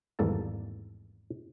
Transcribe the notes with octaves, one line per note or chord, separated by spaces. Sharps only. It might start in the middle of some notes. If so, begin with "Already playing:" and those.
G#1 E2 G3 A#3 A4 A5